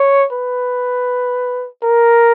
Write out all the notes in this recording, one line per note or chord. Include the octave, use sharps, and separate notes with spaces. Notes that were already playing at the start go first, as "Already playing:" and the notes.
Already playing: C#5
B4
A#4